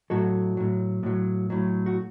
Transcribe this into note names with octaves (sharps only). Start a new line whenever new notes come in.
A2 F#3 F#4 A4
A2 F#3
A2 F#3
A2 F#3
F#4